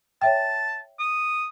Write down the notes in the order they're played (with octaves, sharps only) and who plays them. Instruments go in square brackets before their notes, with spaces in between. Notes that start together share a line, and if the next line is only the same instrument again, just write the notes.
[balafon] C#5 E5 G5 [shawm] A5
[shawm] D#6